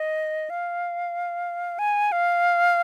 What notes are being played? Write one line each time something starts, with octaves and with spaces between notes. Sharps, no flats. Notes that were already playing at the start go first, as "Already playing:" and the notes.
Already playing: D#5
F5
G#5
F5